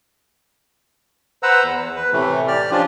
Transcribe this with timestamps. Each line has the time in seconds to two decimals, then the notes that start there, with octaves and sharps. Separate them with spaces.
1.43 B4 C5 F#5 A#5 E6
1.63 E2
1.96 B4
2.13 A2 C3 E3 A3
2.48 G4 D5 F6
2.71 F3 C#4 D4 F4 G4